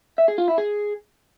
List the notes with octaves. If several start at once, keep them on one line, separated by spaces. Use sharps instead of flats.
E5
G#4
F4
E4
G#4